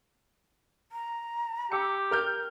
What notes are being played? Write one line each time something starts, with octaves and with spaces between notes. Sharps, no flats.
A#5
G4 D6 E6 C#7
A#4 F6 G6